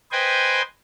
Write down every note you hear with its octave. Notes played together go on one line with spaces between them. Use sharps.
B4 C5 D#5 G5 G#5